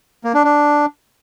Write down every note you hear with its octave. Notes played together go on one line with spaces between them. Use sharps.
A#3
D4
D4